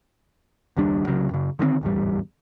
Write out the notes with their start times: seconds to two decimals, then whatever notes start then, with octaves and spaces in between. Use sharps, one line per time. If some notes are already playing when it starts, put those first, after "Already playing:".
0.77 F#1 D#2 G3 D4
1.06 C2 C#3 F#3
1.31 F#2 C#3
1.59 D3 D#3 G3 C4
1.81 D1 G#1 E2 G3